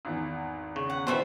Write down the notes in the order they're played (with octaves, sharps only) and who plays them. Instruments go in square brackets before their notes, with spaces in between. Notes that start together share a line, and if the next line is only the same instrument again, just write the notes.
[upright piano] G#1 E2
[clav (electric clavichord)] C#3 [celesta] C#6
[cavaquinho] F#5
[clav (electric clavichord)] B2 E3 G3 [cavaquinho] C5 E5 B5